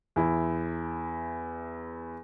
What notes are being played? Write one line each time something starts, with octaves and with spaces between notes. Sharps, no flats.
E2 E4